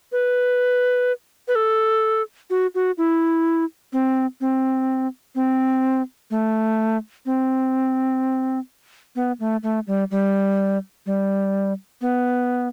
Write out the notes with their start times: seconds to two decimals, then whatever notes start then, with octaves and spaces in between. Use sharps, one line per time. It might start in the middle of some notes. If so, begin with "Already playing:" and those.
0.12 B4
1.48 B4
1.55 A4
2.50 F#4
2.75 F#4
2.98 E4
3.93 C4
4.41 C4
5.35 C4
6.31 A3
7.26 C4
9.16 B3
9.40 A3
9.63 A3
9.87 G3
10.11 G3
11.06 G3
12.01 B3